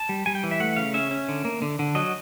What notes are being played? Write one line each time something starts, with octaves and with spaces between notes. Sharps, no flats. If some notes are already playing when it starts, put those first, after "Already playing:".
Already playing: A5
G3
G3 G#5
G5
E3
E5
A3 F#5
C#3 F5
C#4 E5
C#4
D3
A#3
D3
D3
F#3 D#5